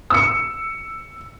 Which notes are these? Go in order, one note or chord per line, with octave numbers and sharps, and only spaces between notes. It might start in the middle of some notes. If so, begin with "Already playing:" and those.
E6 C#7